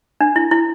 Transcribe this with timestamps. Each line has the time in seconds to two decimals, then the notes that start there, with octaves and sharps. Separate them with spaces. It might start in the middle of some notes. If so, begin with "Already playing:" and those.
0.21 D4
0.36 E4
0.51 E4